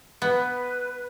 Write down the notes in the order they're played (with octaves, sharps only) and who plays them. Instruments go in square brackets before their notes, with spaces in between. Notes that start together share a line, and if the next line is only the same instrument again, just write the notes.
[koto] B3 [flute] B4